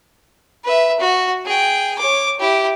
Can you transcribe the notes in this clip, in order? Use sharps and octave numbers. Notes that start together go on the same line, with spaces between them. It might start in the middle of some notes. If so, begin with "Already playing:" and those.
B4 E5
F#4
G#4 G5
C#5 D6
E4 G4